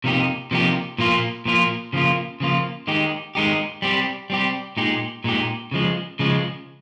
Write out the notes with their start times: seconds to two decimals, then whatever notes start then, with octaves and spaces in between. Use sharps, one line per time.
0.04 C3 F3 A#3 D#4 G4
0.51 C3 F3 A#3 D#4 G4
0.98 A#2 F3 A#3 F4
1.45 A#2 F3 A#3 F4
1.93 C#3 F3 A#3 F4
2.40 C#3 F3 A#3 F4
2.87 D#3 G#3 D#4 G4
3.35 D#3 G#3 D#4 G4
3.82 G3 C4 G4
4.30 G3 C4 G4
4.77 A#2 G#3 D#4 G4
5.24 A#2 G#3 D#4 G4
5.71 C#3 F3 G#3
6.19 C#3 F3 G#3